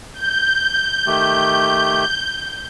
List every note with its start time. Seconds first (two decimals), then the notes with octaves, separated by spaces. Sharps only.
0.14 G6
1.07 D#3 A3 G4